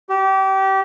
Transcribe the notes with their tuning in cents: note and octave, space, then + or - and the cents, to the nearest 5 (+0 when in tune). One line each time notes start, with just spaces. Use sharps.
G4 -25